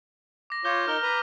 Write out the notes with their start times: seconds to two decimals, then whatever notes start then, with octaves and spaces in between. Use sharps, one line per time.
0.50 D6 A#6
0.65 F4 C#5 D6 G6 G7
0.88 D#4 A#4 F6 G7
1.02 B4 A#5